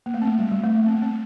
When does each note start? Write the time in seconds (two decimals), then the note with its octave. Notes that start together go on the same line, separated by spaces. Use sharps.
0.06 A#3
0.14 A3
0.21 C4
0.27 A#3
0.39 G3
0.51 G3
0.63 A3
0.75 A#3
0.86 C4
0.95 A#3
1.02 C4